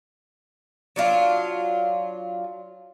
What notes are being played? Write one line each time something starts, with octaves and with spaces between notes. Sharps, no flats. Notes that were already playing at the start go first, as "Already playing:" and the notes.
F#3 D4 F4